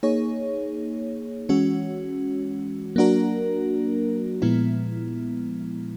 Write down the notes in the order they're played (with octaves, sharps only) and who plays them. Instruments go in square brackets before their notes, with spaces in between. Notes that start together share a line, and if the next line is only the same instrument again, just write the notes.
[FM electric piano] A#3 D#4 G#4 C#5
E3 G#3 C#4 F#4
F#3 A#3 D4 F#4 A#4
A#2 F3 G#3 B3 E4